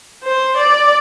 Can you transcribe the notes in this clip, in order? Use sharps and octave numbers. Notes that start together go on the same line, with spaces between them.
C5
D5